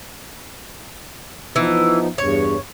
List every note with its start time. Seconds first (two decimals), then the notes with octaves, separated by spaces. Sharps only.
1.56 E3 F3 B3 D#4
2.18 E2 G2 C#5